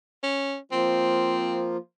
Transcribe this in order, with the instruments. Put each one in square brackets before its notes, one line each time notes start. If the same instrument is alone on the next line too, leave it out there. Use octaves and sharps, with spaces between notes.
[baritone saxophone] C#4
[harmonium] F3 A#3 F4 [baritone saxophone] C4